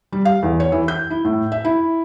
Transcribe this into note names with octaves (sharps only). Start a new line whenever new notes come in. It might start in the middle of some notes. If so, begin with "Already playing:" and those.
G3
F5
E2
C#5
E3
G6
E4
A2
E5
E4